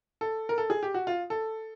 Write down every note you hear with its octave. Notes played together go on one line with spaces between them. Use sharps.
A4
A#4
A4
G#4
G4
F#4
F4
A4